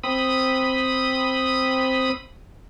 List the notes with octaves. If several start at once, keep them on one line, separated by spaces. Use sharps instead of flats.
C4 B5 D#6